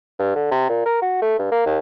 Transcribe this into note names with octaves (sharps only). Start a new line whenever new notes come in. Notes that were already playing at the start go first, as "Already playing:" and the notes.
G2
D3
C3
A#2
A#4
F#4
A3
G2
A#3
D#2